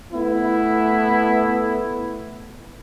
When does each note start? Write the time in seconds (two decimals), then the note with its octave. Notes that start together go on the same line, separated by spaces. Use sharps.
0.13 A3 B3 E4